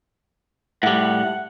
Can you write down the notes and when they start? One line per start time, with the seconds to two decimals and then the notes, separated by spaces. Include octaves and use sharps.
0.83 A2 G3 F#5